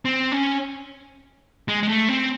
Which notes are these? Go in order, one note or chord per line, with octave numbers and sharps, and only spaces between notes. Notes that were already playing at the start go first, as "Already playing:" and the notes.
C4
C#4
G#3
G#3
A3
C4